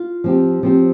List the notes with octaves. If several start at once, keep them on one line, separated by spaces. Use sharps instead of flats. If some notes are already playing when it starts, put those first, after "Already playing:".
Already playing: F4
F3 C4 G4
F3 C4 G4